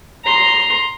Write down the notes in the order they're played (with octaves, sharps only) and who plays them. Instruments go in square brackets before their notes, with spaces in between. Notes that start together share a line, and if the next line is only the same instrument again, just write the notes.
[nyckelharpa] A#5 C6